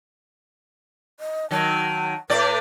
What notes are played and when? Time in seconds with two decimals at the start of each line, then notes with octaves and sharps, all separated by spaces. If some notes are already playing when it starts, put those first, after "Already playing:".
1.20 D#5
1.51 D#3 F#3 A5
2.30 A2 A3 B4 D5